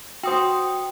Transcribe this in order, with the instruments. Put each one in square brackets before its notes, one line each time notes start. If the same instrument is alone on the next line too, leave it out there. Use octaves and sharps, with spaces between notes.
[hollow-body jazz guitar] F#4 C5 [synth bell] G5 D#6